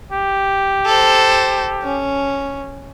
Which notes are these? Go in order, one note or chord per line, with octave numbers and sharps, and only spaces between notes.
G4
A4 C5
C#4